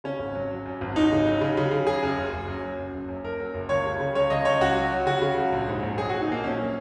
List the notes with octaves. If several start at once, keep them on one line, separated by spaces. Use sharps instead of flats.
C#3 C#4
G#1
F#3
F#3
F#2
G#1
G#1 D#4
C#3
F#3
C#3
C#3
C#3
F#2 G#4
F#2
F#1
F#1
F#2
F#3
F#1
F#1
F#2
F#1 A#4
F#3
F#1
C#2 C#5
C#3
C#3
C#2 C#5
C#2 D#5
C#2 C#5
C#2 F#4
F#3
F#3
C#3 F#4
C#3
C#2
A#1
G#2
A#1
F#3 G#4
F#4
F#3
D#4
A#1 A#3
A#1 C#4
F#3